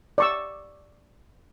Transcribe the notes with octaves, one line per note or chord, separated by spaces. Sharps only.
D5 C#6 E6